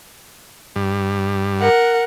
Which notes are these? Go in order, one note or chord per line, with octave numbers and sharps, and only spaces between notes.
G2
A#4 F#5